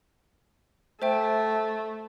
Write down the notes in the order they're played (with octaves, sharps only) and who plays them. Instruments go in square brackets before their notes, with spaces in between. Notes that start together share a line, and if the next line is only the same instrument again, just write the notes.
[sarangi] A3 [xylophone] C5 E5 G5